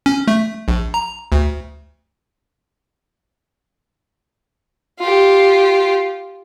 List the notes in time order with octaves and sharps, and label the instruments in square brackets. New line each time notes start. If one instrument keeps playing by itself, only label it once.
[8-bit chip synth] C#4
A3
A#1
A#5
D2
[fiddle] F4 G4